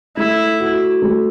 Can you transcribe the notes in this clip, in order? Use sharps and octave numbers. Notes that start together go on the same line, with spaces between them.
A3 E4
F#4
A3